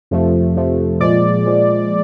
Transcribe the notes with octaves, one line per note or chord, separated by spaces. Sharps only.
F2 C3 F3 A3
F2 C3 F3 A3
A#2 F3 G#3 D5
A#2 F3 G#3